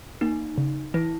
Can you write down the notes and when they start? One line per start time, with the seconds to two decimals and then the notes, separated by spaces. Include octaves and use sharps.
0.21 A#3 D#4
0.58 C#3
0.94 E3 E4